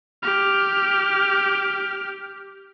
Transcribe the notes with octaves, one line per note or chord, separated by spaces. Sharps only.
G4 F6